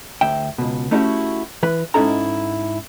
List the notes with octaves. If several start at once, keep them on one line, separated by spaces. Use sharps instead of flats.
D2 E5 G5
C#2 B2
A3 C#4 D#4 E4 F#4 G4
E3 B4
G#2 C#4 D#4 E4 A4 A#5